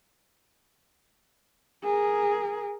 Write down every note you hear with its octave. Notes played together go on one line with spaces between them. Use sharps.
G#4 A#4